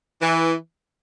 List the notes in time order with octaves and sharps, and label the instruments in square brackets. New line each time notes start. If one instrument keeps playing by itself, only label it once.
[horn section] E3